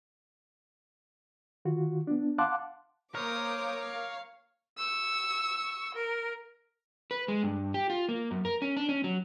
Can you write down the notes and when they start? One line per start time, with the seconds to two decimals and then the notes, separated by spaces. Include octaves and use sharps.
1.65 D#3 F4 F#4
2.07 B3 D4
2.38 F5 F#5 A5 C6 D6 F#6
3.15 A#3 A#4 C5 C#5 D6 D#6
3.80 F5
4.77 C#6 E6
5.94 A#4
7.11 B4
7.28 G#3
7.43 G2
7.74 G4
7.90 F4
8.09 A#3
8.31 F#2
8.45 A#4
8.62 C#4
8.77 D4
8.89 C#4
9.04 F#3